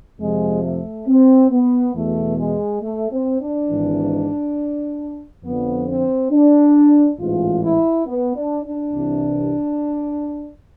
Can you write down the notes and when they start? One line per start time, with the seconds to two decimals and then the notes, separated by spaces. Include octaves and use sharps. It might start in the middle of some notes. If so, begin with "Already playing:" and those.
0.19 F2 C3 F3 G#3
0.64 A3
1.07 C4
1.51 B3
1.94 E2 B2 A3
2.38 G#3
2.81 A3
3.11 C4
3.40 D4
3.69 G#1 G#2 E3
5.43 F2 D3 F3 B3
5.87 C4
6.31 D4
7.19 A1 G#2 E3 F4
7.62 E4
8.06 B3
8.35 D4
8.64 D4
8.93 C2 C3 E3